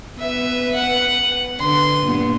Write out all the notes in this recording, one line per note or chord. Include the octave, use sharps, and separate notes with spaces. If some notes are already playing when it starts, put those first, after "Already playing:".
B3 B4 E5
F#5
D3 B4 C6
G2 A#2 B3